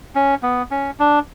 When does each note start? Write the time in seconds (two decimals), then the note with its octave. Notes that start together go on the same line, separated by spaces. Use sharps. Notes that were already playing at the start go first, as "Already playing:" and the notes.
0.15 C#4
0.43 B3
0.71 C#4
1.00 D4